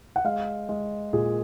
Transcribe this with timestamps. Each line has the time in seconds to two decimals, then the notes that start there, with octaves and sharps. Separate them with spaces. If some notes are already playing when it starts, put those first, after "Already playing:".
0.16 F#5
0.24 G#3 F5
0.69 G#3
1.13 A#2 G#4